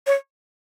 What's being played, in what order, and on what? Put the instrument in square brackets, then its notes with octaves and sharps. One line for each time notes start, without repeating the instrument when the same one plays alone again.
[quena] C#5